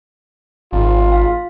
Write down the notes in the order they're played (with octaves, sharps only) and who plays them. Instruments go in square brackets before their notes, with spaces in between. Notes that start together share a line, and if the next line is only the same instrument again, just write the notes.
[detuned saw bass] G#1 [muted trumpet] F4
[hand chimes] F5